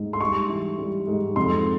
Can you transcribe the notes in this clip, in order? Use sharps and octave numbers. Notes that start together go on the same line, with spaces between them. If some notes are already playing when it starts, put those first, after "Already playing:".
Already playing: G#2
C6
G3 C#6
E3
G3
G#2
F2 C6